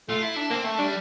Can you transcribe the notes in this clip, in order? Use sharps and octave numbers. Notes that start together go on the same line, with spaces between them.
A3 F4
E4
D4
A#3 C4
A3
G3 D4